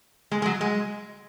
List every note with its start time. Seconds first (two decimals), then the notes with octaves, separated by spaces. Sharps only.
0.32 G#3
0.42 G#3
0.46 F#3
0.61 G#3